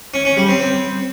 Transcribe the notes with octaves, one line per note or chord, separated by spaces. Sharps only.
C#4
C#4
G3
C4
C4